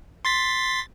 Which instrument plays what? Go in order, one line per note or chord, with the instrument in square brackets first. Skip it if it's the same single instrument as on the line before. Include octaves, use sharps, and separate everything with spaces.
[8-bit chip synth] C6 A6 B6